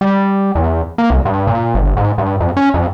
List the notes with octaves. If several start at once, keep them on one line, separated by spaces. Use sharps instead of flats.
G3
E2
A#3
C2
G2
A#2
G1
G#2
G2
F2
C#4
F2